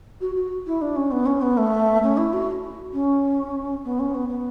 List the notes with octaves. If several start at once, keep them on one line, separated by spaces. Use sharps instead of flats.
F#4
F#4
E4
D4
C#4
B3
C#4
B3
A3
C#4
E4
F#4
C#4
B3
C#4
B3
B3